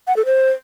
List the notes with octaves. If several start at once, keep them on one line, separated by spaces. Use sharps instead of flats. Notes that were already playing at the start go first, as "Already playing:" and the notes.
F#5
A4
C5